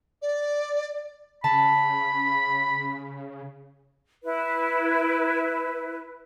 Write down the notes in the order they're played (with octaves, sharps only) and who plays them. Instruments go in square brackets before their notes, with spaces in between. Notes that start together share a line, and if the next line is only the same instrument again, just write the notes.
[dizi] D5
[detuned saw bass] C#3 [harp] A5 [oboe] B5
[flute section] E4 B4